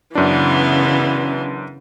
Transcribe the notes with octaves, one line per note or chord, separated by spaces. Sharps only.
F#2 C#3 E3 B3 D4